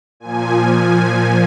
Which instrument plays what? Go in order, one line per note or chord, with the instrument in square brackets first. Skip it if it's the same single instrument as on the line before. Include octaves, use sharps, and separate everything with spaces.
[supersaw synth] A#2 F3 G#5